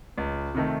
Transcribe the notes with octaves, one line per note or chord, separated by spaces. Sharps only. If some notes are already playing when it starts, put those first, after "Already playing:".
C#2
C3 D#3 A3